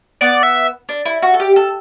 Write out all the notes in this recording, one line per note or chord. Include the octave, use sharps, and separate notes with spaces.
B3 D5
E5
D4
E4
F#4
A4
G4
A4